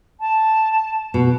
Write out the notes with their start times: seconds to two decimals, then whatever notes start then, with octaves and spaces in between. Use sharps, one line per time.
0.20 A5
1.14 B2